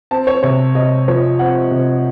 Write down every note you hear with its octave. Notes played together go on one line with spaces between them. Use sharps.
C4 A5
C#5
C3 C#5
C3 D#5
F3 C#5
C4 F#5
C3